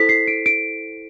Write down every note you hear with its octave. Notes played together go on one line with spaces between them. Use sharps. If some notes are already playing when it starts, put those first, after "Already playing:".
Already playing: E4 A4 C5 B6
C7
D7
D7